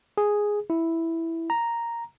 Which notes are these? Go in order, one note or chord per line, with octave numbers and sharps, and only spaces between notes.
G#4
E4
A#5